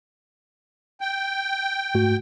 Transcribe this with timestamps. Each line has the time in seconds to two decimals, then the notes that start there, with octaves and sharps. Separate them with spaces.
1.01 G5
1.94 G#2 A3 F#4